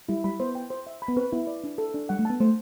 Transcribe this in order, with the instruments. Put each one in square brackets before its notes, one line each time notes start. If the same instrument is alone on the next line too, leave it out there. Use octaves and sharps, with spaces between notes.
[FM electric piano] G3 [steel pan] E4
[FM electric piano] G3 [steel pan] B5
[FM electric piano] B3 [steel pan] C5
[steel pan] G5
C5
E5
B5
[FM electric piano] B3
[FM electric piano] C4 [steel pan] B4
[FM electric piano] B3 [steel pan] E4
[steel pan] D5
D4
A4
D4
[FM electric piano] G3 [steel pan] F#5
[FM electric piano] A3
[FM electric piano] B3 [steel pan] A5
[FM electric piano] A3 [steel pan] C5